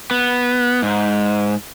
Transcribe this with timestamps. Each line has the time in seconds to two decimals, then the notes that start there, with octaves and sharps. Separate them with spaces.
0.11 B3
0.82 G#2